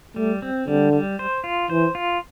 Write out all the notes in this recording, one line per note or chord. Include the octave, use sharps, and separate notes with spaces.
G3 A3
C4
D3 G3
G3
C5
F4
E3 C5
F4